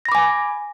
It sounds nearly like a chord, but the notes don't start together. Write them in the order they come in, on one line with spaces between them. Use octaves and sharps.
A#6 B5 D6 G#5